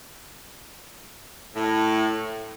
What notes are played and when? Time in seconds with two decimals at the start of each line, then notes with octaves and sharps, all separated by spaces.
1.55 A2